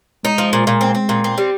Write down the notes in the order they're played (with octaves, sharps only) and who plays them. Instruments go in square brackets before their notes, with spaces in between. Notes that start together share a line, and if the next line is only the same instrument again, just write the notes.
[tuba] G#3 [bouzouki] D#4
[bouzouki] F3
A#2
A#2
C4
C4
A#2
C4
G3